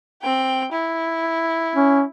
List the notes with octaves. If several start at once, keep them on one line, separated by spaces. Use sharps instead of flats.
C4 G5
E4
C#4